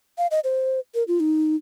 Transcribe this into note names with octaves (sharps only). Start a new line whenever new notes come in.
F5
D#5
C5
A#4
F4
D#4